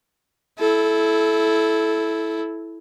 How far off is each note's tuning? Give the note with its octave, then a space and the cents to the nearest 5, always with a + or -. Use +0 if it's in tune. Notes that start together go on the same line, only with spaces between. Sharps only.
E4 +0 A4 -20